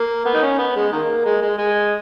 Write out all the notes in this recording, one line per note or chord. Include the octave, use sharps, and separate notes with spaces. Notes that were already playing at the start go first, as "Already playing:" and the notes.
Already playing: A#3
B3
D#4
C#4
B3
G#3
D#3 A#3
G#3
G#3
G#3